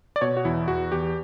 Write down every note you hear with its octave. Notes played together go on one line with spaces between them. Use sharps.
D5
B2 C#5
F#4
E2 E4
E2 F#4
E2 G4